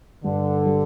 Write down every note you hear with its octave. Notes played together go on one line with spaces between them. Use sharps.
G2 D3
G3